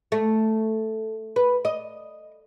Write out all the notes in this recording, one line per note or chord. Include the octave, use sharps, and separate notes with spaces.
A3
B4
D#5